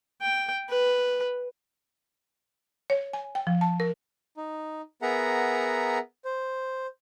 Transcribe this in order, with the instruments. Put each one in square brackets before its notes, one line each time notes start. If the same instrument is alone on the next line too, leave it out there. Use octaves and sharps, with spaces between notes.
[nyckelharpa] G5
B4
[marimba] C#5
G#5
G5
F3
A5
A#4
[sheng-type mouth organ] D#4
B3 G#4 A#4 E5 F#5 A#5
C5